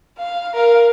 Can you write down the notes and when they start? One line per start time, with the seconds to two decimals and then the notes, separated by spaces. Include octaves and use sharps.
0.18 F5
0.54 A#4 F5